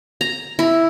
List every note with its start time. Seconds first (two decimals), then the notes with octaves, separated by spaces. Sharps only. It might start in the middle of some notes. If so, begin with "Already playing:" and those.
0.21 A#5
0.59 E4